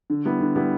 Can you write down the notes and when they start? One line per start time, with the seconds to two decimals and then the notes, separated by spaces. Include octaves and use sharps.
0.10 D3
0.25 G3 B3 E4
0.40 D3
0.56 G3 B3 E4